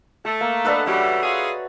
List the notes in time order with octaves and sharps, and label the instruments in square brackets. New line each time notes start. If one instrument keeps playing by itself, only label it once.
[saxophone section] A3 [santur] A4
[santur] A#3
[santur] D4 D#5 B5 [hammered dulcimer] A4 B4 F#5
[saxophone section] C#3 E3 G3 [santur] F#4 C#5 E5
[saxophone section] C#4 F4 G#4 [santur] B5